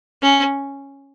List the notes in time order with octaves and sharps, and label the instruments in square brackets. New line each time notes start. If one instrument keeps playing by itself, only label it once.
[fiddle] C#4